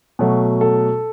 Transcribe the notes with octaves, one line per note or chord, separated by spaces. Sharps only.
B2 F#3 A3
A4